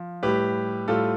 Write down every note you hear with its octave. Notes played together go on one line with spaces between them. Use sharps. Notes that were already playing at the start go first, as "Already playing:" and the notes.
Already playing: F3
A2 G3 G4 B4
A2 G3 F4 A4